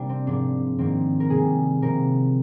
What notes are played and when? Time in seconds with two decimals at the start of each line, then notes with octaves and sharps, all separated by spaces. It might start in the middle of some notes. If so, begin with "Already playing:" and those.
Already playing: C3 G3 A#3 D4
0.09 C4
0.26 G#2 F3 A#3 D4
0.78 G#2 D#3 A#3 C4
1.20 A#4
1.29 C3 G3 A#3 G#4
1.82 C3 F3 A#3 A#4